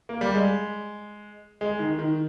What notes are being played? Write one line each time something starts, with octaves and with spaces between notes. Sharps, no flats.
A#3
G3
G#3
G#3
D#3
D#3